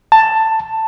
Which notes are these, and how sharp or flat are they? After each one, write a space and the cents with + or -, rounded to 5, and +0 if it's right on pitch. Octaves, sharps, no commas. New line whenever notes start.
A5 +10